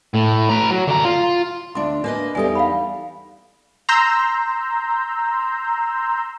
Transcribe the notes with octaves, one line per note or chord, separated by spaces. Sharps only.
A2
B4 A#5
F#3
D3 A#5
F4
D2 D4 C6
A#3 D4 B4 D#5
E2 G3 D#4 A4 G#5
F5 F#5 B5
A#5 C6 E6 G6